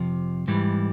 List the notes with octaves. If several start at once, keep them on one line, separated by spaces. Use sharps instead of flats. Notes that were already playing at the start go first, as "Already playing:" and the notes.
Already playing: F2 C3 F3
G#2 E3 G3